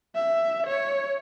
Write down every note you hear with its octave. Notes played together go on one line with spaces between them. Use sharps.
E5
C#5